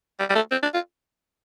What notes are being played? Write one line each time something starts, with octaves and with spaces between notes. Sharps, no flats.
G3
G3
A3
C4
D4
F4